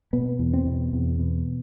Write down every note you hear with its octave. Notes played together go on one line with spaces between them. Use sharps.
B2 B3
E2
C4
B2
E2
B2